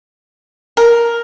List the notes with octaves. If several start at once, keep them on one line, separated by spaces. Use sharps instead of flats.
A#4